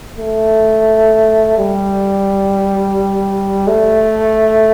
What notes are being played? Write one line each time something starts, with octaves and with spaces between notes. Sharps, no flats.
A3
G3
A3